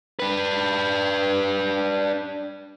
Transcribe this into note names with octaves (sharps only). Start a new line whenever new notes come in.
D4 B4